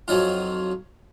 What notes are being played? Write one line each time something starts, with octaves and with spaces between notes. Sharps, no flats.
F2 F#3 D#4 F4